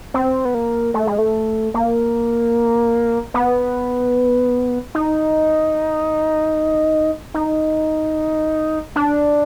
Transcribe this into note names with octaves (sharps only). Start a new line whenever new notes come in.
C4
B3
A#3
A3
G#3
A3
A#3
B3
D#4
D#4
D4